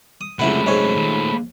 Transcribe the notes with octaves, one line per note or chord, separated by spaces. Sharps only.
D#6
C#2 F#2 C3 A3 E4 F#5 B5
G#2 C#5 G#5
D#2 A#2